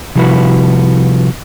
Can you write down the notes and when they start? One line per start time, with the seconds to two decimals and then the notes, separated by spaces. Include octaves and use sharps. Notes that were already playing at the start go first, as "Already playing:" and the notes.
0.15 C3 F3 G3 E4 F#4 B4